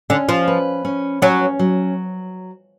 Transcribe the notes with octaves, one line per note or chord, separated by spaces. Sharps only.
D3 C#4
F3
B4
C#4
F#3 C#4
F#3